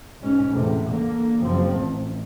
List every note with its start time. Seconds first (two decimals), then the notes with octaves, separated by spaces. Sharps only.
0.21 B1 G#2 C#4
0.51 E2 A2 C3
0.90 D3 A#3
1.41 F#1 F3 C4
1.76 A1